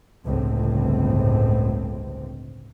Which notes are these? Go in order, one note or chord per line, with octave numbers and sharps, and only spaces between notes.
G1 C#2 A2 C4